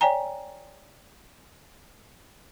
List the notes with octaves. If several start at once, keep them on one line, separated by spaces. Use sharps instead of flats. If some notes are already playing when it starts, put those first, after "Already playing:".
C#5 D5 G5 G#5 A#5